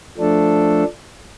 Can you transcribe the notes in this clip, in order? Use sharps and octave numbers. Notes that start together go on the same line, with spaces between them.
F3 A3 D4 A4